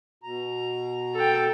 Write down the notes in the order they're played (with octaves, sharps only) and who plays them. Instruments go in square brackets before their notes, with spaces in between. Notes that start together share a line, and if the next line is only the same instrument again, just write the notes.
[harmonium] B2 A#5
[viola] A4 G5